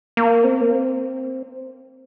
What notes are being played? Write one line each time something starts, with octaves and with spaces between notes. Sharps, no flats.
A#3
C4
A#3
C4